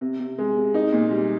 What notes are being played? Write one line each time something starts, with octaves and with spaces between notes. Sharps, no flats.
C3
C3
G#3
C3
D#4
A#2
G3